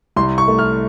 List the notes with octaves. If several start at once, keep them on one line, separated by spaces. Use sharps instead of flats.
C2 C6
C#6
A3
F6